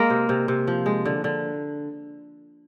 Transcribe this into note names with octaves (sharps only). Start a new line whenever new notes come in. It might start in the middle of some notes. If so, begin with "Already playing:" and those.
Already playing: G#3 A#3 A#4
C3
C3
C3
F3
G#3
D3
D3